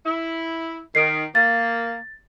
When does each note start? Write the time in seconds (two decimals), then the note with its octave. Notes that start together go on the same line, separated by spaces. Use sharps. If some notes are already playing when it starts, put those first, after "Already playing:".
0.06 E4
0.95 D#3 C7 D7
1.35 A#3 A6